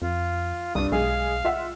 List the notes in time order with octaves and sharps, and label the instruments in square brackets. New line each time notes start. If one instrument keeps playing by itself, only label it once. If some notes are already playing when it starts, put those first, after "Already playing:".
[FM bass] F2 [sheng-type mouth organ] F4
[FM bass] C2 [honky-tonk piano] G2 D4 [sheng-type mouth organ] D#6
[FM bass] B1 [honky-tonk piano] G#3 G#4 [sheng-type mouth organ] F5
[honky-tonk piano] F4 E5 F#5